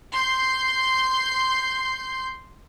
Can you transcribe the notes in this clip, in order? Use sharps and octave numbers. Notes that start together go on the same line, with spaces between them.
C6 G6